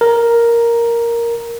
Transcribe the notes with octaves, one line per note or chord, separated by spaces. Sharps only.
A#4